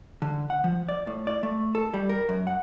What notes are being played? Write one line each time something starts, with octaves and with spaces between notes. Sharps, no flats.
D3
F#5
F3
D5
A2
D5
A3
A4
G3
A#4
F#2
F#5